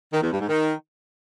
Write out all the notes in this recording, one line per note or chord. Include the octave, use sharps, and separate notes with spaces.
D#3
E2
G2
G#2
D#3